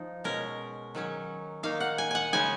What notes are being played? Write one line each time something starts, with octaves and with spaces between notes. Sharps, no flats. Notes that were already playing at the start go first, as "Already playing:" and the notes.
Already playing: F3 D#4
B2 G#3 C#4 A#4
D#3 F#3 C#4
D#3 A#3 D#4 F5
F#5
G#5
F#5 G#5
C#3 G#3 D#4 G#5